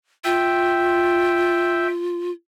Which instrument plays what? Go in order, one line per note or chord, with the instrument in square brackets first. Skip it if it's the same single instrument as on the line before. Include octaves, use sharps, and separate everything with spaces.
[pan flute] F4 [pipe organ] E5 G5